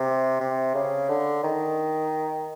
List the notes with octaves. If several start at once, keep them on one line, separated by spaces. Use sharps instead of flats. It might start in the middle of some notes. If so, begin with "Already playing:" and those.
Already playing: C3
C3
C#3
D3
D#3